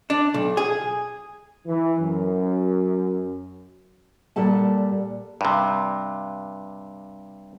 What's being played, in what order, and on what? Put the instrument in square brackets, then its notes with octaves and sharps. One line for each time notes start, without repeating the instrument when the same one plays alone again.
[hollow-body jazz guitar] D4
B1
G#4
[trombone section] E3
F#2
[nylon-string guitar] A#2 G3 A4 F#5 A5
[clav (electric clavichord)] G2 C3